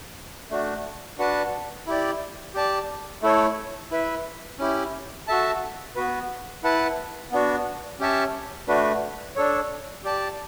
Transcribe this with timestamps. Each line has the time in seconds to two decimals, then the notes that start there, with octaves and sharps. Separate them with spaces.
0.50 A3 D4 F#4
1.18 D4 F#4 B4 F#5 A5
1.87 E4 G4 D5
2.54 G4 D5 A5
3.22 A3 E4 A4 C#5
3.91 E4 B4 E5
4.59 C#4 E4 G4
5.28 F#4 A4 E5 A5
5.96 B3 F#4 B4
6.63 E4 B4 F#5 A5
7.32 B3 D4 F#4
8.00 C#4 G4 C#5 E5 A5
8.68 A3 D4 F#4 B4
9.36 D4 A4 C#5
10.04 G4 D5 A5